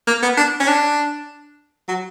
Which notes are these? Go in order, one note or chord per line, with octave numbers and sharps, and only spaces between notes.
A#3
B3
D4
C#4
D4
F#3